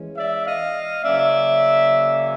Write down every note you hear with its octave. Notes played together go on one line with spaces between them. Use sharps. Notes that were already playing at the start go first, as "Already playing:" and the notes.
Already playing: E3 G#3 C#4
D5 E5
D#5 F5
C#3 F#3 A#3 C#4 D5 E5